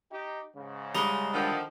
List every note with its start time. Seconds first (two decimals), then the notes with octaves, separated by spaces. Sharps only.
0.12 D#4 G4
0.56 G#2 C#3
0.95 G3 G#3 D#4
1.33 D3 D#3 F3